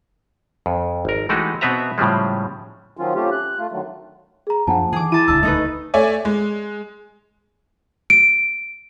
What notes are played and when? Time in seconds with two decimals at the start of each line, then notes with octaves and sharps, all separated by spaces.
0.66 F2
1.05 G#1 A#4
1.29 E3 G#3 A3 D#4 F#4 G4
1.61 B2 B3 C4 B4 E5 A#5
1.98 A2 C#3 F3 G3 G#3
2.97 D#3 F3 F#3 C#4 F4
3.15 A3 C4 C#4 F4 G4
3.32 F#6
3.58 A3 F4
3.72 D3 D#3 F#3 A3
4.47 G#4 A#5
4.67 F#2 F3 A#3 D4 F#5 G#5 A5
4.93 D#3 E3 G#4 D6
5.12 E4 A5 D#7
5.28 D#1 C#2 D3 A5 E6
5.43 A3 D#4 B4 D#5
5.94 A3 C#5 D5 E5 G#5
6.25 G#3
8.10 D7